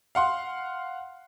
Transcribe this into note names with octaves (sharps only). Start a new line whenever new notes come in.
F5 F#5 C6